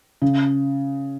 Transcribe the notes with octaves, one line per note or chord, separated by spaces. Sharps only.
C#3